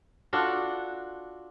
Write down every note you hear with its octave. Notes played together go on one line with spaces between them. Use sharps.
D4 F4 F#4 A4